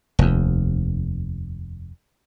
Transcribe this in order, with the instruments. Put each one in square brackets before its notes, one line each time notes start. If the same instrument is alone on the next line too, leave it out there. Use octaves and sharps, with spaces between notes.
[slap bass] F1 D#2